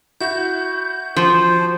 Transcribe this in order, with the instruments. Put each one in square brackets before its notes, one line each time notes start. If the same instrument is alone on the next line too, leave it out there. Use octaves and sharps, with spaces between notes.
[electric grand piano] E4 F#4 E5 [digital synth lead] G6
[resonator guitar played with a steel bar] F3 [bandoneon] C5